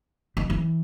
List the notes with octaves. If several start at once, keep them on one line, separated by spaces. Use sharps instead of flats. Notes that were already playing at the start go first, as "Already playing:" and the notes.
D#3
E3